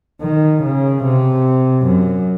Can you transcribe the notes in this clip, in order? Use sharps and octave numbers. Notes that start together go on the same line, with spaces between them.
D#3
C#3
C3
F#2